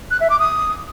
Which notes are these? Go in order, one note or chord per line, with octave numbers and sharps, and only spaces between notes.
F#6
E5
D6
D#6